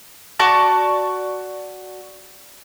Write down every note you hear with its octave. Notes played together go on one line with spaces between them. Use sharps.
F#4 D5 A5 C#6